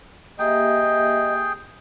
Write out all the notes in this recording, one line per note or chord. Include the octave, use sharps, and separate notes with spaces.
A#3 G4 G#4 D#5 E5 G5